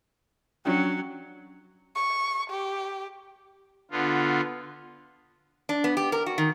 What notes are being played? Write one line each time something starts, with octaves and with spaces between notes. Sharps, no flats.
F#3 C#4 D4 G5
C#6
G4
D3 B3 F4
D4
B3
G4
A#4
F#4
D#3